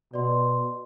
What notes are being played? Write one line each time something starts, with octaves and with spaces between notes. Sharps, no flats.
B2 D5 C6